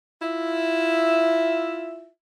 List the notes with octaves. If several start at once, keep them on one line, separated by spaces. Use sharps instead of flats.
E4 F4 E5